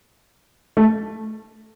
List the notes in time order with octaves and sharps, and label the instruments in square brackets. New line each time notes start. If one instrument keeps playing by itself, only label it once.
[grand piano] A3